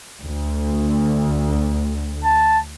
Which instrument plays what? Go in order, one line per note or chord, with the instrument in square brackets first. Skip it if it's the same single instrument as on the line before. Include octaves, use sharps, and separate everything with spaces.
[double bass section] D2
[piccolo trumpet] A5